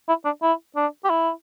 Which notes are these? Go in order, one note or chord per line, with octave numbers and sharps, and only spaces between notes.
E4
D4
E4
D4
G4
E4